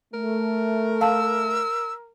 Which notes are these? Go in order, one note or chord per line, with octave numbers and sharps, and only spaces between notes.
A3 A#4
F5 A5 E6